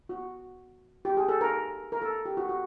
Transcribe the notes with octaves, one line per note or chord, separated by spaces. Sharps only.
F#4
G4
G#4
A4
A#4
A#4
A4
G4
F#4
F#4